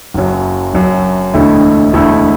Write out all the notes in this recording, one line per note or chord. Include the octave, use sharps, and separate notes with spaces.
F#1 F#2 F#3
F#1 F#2 F#3
E1 D2 D3 A3 E4
E1 D2 D3 A3 E4